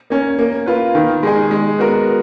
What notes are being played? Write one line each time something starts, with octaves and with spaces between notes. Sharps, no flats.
A#3 C#4
A#3
F4 B4
D#3
G#3 D#4 G#4
G#3
B3 F#4 A#4